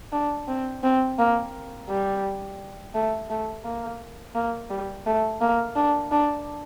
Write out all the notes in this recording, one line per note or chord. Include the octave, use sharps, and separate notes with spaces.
D4
C4
C4
A#3
G3
A3
A3
A#3
A#3
G3
A3
A#3
D4
D4